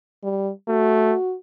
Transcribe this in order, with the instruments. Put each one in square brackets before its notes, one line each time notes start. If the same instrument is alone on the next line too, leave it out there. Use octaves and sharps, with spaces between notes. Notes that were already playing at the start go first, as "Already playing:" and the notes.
[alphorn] G3
[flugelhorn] A3 [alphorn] F#4